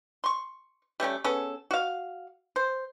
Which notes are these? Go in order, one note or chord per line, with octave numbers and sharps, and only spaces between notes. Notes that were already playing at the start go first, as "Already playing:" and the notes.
C6 C#6
G3 A3 C#4 G4
B3 C#4 G#4 A4
F#4 F5
C5